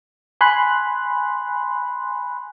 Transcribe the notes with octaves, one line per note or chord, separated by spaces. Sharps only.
G#5 B5 C6 F#6